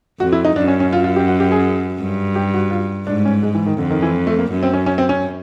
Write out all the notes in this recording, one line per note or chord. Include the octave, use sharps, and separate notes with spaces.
F2 F#4
E4
D#4
F#2 D4
C#4
C#4
F4
F4
G4
F#4
G4
G#4
G2
G4
F#4
F4
G#2 D4
C#4
G#3
E3
D#3
F2 D3
D#3
E3
A3
A#3
F#2
C4
C#4
C#4
C4
C#4